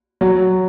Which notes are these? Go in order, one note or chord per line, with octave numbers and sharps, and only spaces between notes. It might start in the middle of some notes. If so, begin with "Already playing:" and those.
F#3